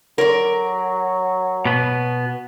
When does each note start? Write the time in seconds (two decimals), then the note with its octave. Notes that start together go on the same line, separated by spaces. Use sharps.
0.18 F#3 A#4 D5
1.65 B2 B3